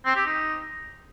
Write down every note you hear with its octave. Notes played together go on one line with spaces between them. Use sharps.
C4
G4
D#4